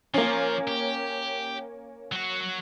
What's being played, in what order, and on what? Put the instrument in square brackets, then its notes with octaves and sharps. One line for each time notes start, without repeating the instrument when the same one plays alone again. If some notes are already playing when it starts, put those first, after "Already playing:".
[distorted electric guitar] F3 [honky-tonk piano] A#3 C#4
[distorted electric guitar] G4
F#3 F#4